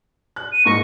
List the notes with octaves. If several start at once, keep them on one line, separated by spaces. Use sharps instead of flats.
F#6
D#7
G#2 A#3 C#6 A#6